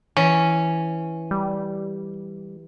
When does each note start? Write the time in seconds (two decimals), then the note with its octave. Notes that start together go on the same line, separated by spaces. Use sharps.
0.17 E3 C#4
1.31 G3